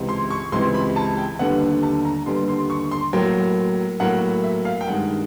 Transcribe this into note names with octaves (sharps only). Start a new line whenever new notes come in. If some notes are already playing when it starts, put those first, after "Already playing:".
Already playing: C#2 C3 E3
C6
C#6
C#2 C3 E3 C6
B5
A5
G5
D#2 D3 G3 B3 F#5
A5
A#5
D#2 D3 G3 B3 C6
C6
C#6
C6
A2 F#3 A#3 G5
A2 F#3 A#3 F#5
E5
F5
G5
G2 D#3 G#3 F#5